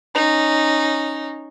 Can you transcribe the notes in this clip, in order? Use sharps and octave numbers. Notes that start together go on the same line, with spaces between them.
C#4 D#4